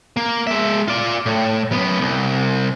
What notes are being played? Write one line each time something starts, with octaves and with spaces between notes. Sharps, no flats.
A#3
G#3 E5
F4 D5
A2
F#2 B3
C2